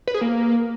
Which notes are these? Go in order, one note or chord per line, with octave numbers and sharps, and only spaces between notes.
B4
G#4
A#3